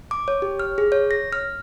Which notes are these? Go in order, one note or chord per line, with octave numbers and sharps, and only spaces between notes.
D6
C#5
G4
F6
G#4
C#5
A#6
F6